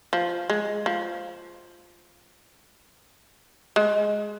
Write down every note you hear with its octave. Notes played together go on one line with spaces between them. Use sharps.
F3
G#3
F3
G#3